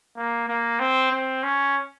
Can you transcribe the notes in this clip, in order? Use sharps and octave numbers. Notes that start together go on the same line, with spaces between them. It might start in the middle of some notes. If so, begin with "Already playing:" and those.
A#3
A#3
C4
C4
C#4